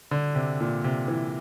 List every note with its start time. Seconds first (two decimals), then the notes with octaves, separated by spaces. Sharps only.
0.11 D3
0.35 C3
0.61 A#2
0.84 C3
1.08 E3